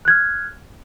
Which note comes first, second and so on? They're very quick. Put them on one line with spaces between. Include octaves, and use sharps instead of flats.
F#6 G#6 F6